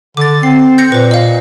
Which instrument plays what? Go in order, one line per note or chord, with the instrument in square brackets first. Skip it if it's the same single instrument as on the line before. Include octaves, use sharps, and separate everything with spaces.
[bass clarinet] D3 [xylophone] D6 A6
[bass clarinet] C4 [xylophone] C7
[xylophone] G6 A#6 C#7
[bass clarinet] A#2 [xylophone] B4 C5
[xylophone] D#5 F5